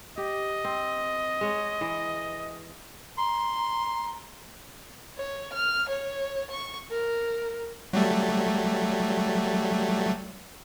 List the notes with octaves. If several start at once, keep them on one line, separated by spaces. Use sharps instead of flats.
G4 D#5
C4
G#3 C#5
E3
A#5 C6
C#5
F6
C#5
C#6
A#4
F#3 G3 A3